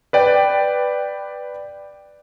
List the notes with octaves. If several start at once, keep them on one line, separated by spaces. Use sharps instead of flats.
B4 D5 G5